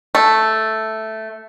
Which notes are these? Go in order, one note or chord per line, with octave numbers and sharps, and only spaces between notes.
A3